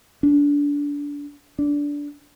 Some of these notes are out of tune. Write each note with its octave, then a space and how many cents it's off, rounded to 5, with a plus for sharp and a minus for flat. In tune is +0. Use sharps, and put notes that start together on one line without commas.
D4 -25
D4 -15